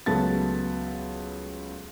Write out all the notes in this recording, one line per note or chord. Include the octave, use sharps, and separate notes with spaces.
C#2 F#3 A3 B3 A5 A6